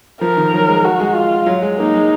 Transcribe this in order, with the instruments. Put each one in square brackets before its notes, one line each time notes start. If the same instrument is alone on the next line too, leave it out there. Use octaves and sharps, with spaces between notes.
[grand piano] F3 [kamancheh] A#4
[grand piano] D#3
F#3
G#3
[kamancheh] F#4
[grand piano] G#3
[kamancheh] F4
[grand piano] F#3
G#3
[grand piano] A#3 [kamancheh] D#4
[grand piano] G#3